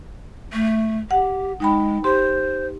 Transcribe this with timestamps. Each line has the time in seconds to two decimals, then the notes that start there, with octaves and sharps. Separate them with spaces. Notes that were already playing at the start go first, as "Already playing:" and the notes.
0.53 A3
1.11 G4 F#5
1.60 G#3 D#4 G5 B5
2.04 G4 C5 C6